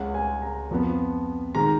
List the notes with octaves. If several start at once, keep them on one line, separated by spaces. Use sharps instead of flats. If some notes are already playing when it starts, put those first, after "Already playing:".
Already playing: C#2 C#3 G#3 C#4 F#5
G#5
A#5
F2 F3 B3
D#3 G#3 A#5